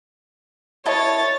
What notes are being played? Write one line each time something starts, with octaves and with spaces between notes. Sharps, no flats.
E4 C#5 D#5 A5 A6